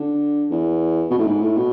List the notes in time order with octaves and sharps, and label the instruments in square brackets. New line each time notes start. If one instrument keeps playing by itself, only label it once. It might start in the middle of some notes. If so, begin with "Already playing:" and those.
Already playing: [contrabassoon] D3
E2
B2
A2
G#2
A2
B2